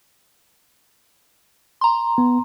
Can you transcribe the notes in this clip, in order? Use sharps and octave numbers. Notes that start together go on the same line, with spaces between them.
A#5 C6
B3